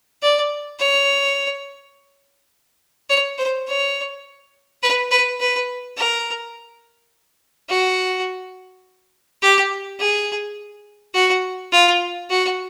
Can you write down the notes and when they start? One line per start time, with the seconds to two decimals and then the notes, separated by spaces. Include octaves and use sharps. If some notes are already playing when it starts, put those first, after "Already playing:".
0.22 D5
0.79 C#5
3.10 C#5
3.38 C5
3.68 C#5
4.83 B4
5.11 B4
5.40 B4
5.97 A#4
7.70 F#4
9.42 G4
9.99 G#4
11.14 F#4
11.72 F4
12.30 F#4